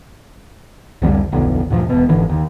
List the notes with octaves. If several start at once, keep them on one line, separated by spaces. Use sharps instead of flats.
C2 F2 D3 G3
D1 B1 F2 D3
D2 G2 A#2 F3
E1 B2
F#1 G#2 D3 E3
D#2